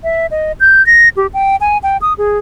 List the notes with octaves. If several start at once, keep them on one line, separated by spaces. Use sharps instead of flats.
E5
D#5
G6
A#6
G4
G5
G#5
G5
D#6
G#4